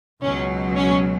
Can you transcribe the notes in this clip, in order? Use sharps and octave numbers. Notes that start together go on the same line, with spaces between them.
C#2 B2 F#3 C#4
C#4